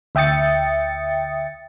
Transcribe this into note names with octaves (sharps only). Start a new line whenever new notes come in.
D2 E5 G5 D#6 A6 C#7